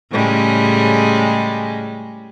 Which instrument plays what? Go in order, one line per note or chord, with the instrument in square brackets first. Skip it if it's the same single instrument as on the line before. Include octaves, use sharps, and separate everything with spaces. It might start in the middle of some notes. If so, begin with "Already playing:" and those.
[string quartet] A2 C#3 G3 G#3